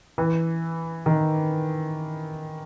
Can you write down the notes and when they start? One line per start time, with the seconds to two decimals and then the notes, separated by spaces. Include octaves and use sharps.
0.18 E3
1.06 D#3